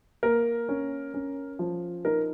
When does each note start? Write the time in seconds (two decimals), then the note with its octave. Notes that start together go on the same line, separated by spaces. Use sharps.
0.23 A#3 A#4
0.69 C#4
1.14 C#4
1.59 F3
2.05 D#4 A#4